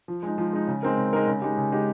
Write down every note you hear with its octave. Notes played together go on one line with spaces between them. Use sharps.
F3
G#3 D#4
F3
G#3 D#4
C#3
G#3 C4 D#4 A#4
C#3
G#3 C4 D#4 A#4
C#3
G#3 D#4 G4
C#3
G#3 D#4 G4